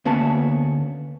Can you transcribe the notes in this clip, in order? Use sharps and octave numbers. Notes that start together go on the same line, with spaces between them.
D2 A#3 B3 C#4 A5